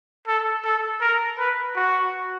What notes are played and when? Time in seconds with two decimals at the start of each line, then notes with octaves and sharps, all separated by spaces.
0.27 A4
0.65 A4
1.01 A#4
1.38 B4
1.76 F#4